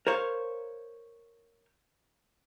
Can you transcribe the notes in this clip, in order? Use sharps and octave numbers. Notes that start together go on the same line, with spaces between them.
A#4 C5 C#5 F5